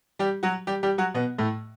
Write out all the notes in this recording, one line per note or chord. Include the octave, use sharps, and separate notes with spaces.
G3 G4
F#3 F#4
G3 G4
G3 G4
F#3 F#4
B2 B3
A2 A3